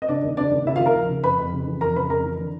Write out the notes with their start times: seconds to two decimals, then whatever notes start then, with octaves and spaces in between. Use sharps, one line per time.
0.02 D#5
0.08 C#3 D4 D5
0.23 D#2
0.37 C#3 D4 D5
0.51 D#2
0.66 C#3 E4 E5
0.76 F4 F5
0.80 D#2
0.86 A#4 A#5
0.95 F3
1.09 C#3
1.24 F2 B4 B5
1.39 F2
1.53 C#3
1.67 E3
1.81 F2 A#4 A#5
1.95 C#3 B4 B5
2.10 F2 A#4 A#5
2.24 E3
2.39 D3